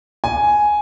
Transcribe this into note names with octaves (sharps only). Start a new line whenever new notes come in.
G#5